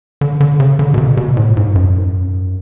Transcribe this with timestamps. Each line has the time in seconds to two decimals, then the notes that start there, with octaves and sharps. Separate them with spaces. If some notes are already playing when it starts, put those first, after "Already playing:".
0.21 D3
0.40 D3
0.60 C#3
0.79 D3
0.94 B2
0.98 C3
1.17 B2
1.37 A2
1.57 G#2
1.75 F#2